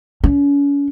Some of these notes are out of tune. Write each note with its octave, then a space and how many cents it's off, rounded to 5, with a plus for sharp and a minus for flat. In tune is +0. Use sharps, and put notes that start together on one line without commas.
C#4 +35